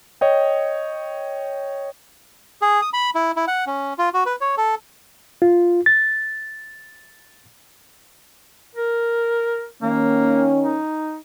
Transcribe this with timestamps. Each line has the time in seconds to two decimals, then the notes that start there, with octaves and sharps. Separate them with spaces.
0.21 C#5 D#5 G5
2.62 G#4
2.82 D#6
2.93 B5
3.15 E4
3.36 E4
3.48 F#5
3.67 C#4
3.98 F4
4.14 F#4
4.26 B4
4.41 C#5
4.57 A4
5.42 F4
5.86 A6
8.75 A#4
9.82 D#3 A#3 C#4
10.63 D#4